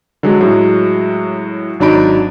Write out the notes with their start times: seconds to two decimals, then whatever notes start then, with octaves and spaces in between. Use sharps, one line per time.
0.23 D3 F#3 G#3 D4
0.41 A2 F#3 G#3
1.80 G#1 F#3 D4 D#4 B5 D7